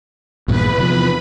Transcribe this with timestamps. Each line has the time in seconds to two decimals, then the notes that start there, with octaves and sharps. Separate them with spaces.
0.48 A#1 E2 G2 A#2 B4 B5
0.78 C3 E3 F3